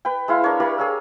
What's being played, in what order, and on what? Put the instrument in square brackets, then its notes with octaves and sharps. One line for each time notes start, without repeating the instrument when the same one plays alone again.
[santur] B4 G5
G#3 E4 F5
D4 A#4 C#5
G4 A#4 D5 F5
G#4 C#5 E6